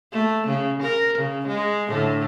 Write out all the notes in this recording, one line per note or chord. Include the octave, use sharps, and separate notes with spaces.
A3
C#3
A#4
C#3
G#3
A2 D3 A3